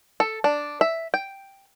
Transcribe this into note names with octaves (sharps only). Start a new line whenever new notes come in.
A4
D4
E5
G5